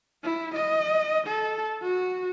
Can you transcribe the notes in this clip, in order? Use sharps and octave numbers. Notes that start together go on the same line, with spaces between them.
E4
D#5
A4
F#4